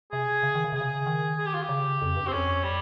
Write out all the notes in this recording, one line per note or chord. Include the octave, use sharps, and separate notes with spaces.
C3 G#4
C#3
D#3
C#3
C3 G#4
C#3
D#3
G#4
G4
F4
G4
C#3
F2
G2
C4
F2 C#4
G3